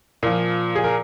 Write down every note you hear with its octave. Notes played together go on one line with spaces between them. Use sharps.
A#2 F3
G#4
A#4